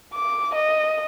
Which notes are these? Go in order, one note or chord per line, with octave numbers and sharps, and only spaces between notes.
D6
D#5